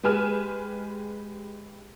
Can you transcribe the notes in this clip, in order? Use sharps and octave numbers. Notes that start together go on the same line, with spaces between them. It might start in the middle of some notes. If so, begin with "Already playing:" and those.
G#3 G4 B4 G#5 F6 E7